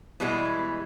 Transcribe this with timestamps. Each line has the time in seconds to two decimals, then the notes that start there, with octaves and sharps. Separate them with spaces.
0.20 B2 E3 G3 G#3 B3